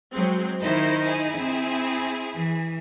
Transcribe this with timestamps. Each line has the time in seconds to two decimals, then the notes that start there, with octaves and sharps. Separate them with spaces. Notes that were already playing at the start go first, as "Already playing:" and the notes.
0.13 F#3 G#3 C4
0.62 D#3 D#4 E4 C5
1.05 E4 G#4
1.37 C4
2.34 E3